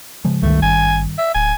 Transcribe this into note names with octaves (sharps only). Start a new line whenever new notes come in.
C#3 F3 G#3
C#2 G2 D#3 A3
G#1 G#5
E5
D1 G#5